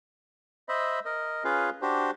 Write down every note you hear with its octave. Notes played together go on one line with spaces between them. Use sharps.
C5 D#5 E5 B5
A#4 D#5
C#4 F4 G#4 B4 F5
D4 F#4 G4 C5